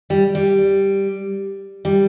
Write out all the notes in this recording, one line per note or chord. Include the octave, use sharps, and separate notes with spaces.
G3
G3
G3